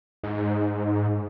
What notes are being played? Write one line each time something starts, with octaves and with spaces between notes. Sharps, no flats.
G#2